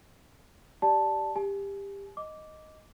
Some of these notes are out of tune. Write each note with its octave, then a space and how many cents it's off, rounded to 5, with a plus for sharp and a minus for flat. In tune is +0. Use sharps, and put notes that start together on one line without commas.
G4 -10 D5 +0 A5 +0
G4 +20 G#5 +40
D#5 +0 D6 -10